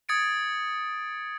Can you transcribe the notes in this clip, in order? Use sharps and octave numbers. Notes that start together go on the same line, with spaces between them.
D#6 G#6 A6 C#7 D7